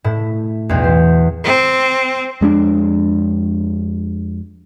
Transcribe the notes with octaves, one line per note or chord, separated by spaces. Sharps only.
A2 E4
B1 E2
C5
C4
F2 G#3 C#4 D4